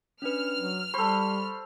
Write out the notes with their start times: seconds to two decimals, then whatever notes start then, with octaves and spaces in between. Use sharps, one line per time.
0.22 C#4 D4 B4 F6
0.58 F#3
0.94 G3 A4 C5 B5 C#6